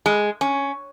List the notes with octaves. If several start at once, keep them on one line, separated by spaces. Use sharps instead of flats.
G#3
C#4